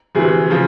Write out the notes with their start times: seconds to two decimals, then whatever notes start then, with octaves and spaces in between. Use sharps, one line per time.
0.15 D2 C3 E3 G#4
0.50 C#3 F3